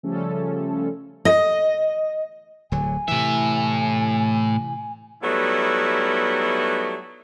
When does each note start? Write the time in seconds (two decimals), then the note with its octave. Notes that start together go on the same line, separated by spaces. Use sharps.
0.03 C#3 F3 G3 A3 C#4 A4
1.25 D#5
2.72 D1 D3 F#3 G#5
3.08 A2 C3 E3 E5
5.23 F#3 G3 A3 B3 D#4 E4